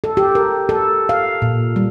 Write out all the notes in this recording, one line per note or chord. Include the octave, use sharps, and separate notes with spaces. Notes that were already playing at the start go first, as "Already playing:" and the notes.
A4
G4
A#4
A4
F5
A#2
G3